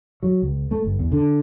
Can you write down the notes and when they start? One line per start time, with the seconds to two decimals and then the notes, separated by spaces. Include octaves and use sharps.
0.23 F#3
0.42 C#2
0.71 A3
0.84 G1
0.99 E2
1.12 D3